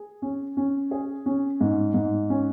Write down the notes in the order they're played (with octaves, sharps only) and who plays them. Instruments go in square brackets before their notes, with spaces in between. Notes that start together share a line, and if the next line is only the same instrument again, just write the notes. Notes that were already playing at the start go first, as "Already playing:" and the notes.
Already playing: [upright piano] G#4
C#4
C#4
G#4
C#4
G#2
G#2
C#4